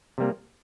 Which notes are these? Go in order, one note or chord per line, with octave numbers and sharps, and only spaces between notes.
C3 G3 A#3